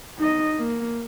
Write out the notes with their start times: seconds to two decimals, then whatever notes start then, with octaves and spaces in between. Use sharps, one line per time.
0.19 D#4 D#5
0.59 A#3